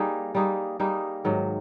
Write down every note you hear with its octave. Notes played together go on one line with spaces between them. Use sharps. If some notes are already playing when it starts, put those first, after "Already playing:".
Already playing: G3 A#3 D#4 G#4
G3 A#3 D#4 G#4
G3 A#3 D#4 G#4
G#2 D#3 F#3